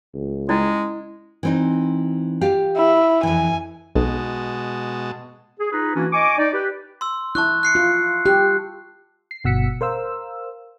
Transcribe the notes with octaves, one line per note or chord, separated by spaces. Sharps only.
C#2
G#3 C#4 E4 D5
E3 C4 D#4
F4 G4 F5
E4
F2 E3 G#5
B1 B2 G#3 A5
G#4
D#4 F4 G#4 B4
E3 A#3 C#4 D4 E4 F#4
D#5 G#5 C#6 D6
D#4 D5
G4 B4
C6 E6
E4 A5 C#6 F#6
F#6 C7 C#7
F4
G4 F#6
C7
G1 B2 F#5 E6 B6 C#7
A#4 C5 F5 E6